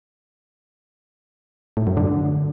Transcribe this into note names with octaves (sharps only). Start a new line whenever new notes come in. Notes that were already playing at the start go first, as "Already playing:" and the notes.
A2
F#2
D3